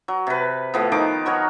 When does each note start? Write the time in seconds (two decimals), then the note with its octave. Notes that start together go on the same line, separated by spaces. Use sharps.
0.08 F#3
0.27 C3 B4
0.74 A2 F3 B3
0.92 D#3 F3 D#4 D6
1.26 F#3 F#4 A#4 C#5